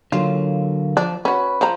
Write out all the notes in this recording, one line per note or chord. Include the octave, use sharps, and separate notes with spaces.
D3 F#3 A#3 F4
F3 D4
C#4 F#4 B4
F3 A#5